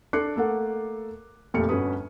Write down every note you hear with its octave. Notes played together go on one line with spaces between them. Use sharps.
D4 A4 D6 F#6 C7 C#7
A3 A#3 A4 F#5
F1 A#2 A3 G4 F6 C#7
G1 C#4 F#4 B4 D#6